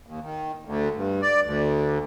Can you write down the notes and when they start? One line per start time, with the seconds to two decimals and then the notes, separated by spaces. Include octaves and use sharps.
0.07 D#2
0.23 D#3
0.65 D2
0.95 G2
1.22 D5
1.45 D2